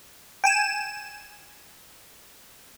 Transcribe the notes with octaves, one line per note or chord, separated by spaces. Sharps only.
G5 G#5 E7